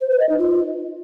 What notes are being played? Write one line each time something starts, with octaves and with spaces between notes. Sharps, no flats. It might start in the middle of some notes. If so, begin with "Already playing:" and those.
C5
B4
D#5
D#4
F4